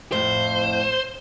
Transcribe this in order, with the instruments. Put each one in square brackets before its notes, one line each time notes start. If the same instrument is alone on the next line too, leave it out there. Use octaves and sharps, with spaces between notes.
[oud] F2 A2 [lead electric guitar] C5